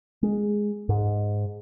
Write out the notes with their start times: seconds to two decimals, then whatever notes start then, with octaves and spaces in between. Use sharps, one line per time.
0.23 G#3
0.89 G#2